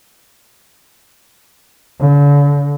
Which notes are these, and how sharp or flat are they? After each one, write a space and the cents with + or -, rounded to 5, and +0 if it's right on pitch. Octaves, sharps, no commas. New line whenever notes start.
D3 -40